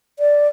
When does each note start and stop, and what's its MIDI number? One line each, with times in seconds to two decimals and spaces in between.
0.19 0.48 74